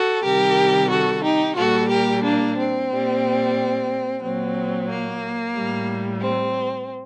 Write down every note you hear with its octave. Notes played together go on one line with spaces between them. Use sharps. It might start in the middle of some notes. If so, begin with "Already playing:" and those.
Already playing: F#4 A4
C3 D#3 G3 G4 A#4
F#4 A4
D#4 G4
A#2 G3 F#4 A4
G4 A#4
A#3 D4
C4
A#2 G3
A#2 F#3 C4
A#3
A2 G3
C4